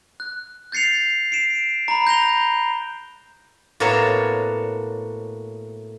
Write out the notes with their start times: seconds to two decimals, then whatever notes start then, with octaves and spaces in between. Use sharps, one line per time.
0.20 F#6
0.72 G6 A6 C7 C#7 F7
1.32 C7 D7 E7
1.88 A#5 B5
2.07 G6 A#6 F7 G7
3.80 A2 A#3 B3 F#4 C#5 A5